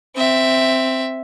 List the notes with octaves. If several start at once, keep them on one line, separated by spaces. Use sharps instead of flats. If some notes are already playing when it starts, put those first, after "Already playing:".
C4 E5